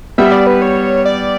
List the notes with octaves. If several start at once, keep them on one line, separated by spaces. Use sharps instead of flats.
G3 B3 E5
D5
B4
C#5
D5